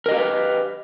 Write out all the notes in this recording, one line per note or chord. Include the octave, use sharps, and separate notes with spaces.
G4 A#4 B4 D#5 F5